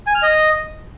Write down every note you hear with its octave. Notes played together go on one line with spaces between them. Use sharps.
G#5
F6
D#5